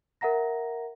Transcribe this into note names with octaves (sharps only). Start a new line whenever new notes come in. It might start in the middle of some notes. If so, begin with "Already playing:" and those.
A#4 E5 F#5 A#5 A#6